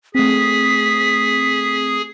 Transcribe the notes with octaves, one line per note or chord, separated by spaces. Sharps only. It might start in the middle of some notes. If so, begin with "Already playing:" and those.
A3 C4 G#4 B6